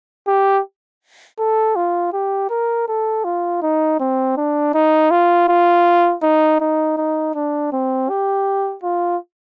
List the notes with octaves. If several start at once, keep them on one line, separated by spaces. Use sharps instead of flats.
G4
A4
F4
G4
A#4
A4
F4
D#4
C4
D4
D#4
F4
F4
D#4
D#4
D#4
D4
C4
G4
F4